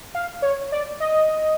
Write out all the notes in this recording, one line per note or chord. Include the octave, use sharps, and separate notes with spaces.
F5
C#5
D5
D#5